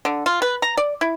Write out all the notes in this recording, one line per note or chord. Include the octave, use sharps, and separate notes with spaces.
D3
F4
B4
A#5
D5
E4